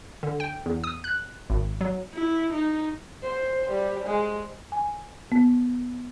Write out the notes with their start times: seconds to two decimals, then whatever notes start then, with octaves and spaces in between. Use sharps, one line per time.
0.23 D3
0.40 G5
0.66 E2
0.84 D#6
1.04 F#6
1.50 G#1
1.81 F#3
2.14 E4
2.53 D#4
3.23 C5
3.71 G3
4.07 G#3
4.72 G#5
5.32 B3